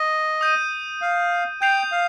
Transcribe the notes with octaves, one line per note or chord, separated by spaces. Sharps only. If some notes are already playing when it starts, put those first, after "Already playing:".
Already playing: D#5
D#6 G6 D#7
F5
G5 G6 C7 F7
F5